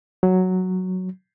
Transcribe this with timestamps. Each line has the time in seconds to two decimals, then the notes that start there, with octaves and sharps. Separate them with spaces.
0.23 F#3